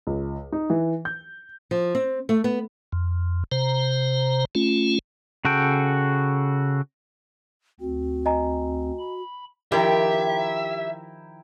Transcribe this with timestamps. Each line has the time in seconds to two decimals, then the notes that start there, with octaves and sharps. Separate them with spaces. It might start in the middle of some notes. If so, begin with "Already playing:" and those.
0.07 C#2
0.52 D#4
0.70 E3
1.05 G6
1.71 F3
1.95 C4
2.29 A3
2.44 B3
2.92 F2
3.52 C3 C5 A#5
4.55 A3 C#4 F4
5.45 C#3 F#4 A4 G5
7.80 D2 C4 F#4
8.26 D#5 G#5 A#5
8.99 B5
9.72 D#3 F3 E4 G4 E5 G5 A#5